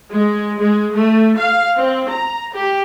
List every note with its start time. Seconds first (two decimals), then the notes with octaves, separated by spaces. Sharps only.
0.12 G#3
0.60 G#3
0.94 A3
1.37 F5
1.77 C4
2.10 A#5
2.54 G4